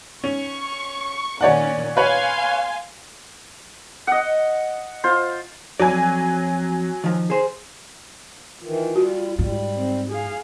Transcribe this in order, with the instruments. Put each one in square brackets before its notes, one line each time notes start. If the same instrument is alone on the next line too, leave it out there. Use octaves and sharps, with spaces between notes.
[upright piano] C#4 [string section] C#6
[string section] A#2 D#3 C#4 [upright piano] C#5 D5 F#5
[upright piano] B4 C#5 [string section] F5 G#5 C6
[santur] D#5 F#5
F4 C5
[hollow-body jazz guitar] F2 D5 [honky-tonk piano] F#3 G#5
[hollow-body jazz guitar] D#3 F3
G#4 C5
[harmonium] D#3 E3 [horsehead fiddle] F4
[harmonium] G3 [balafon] F#4
[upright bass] G#2 [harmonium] G3
[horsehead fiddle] C4
G#4 F5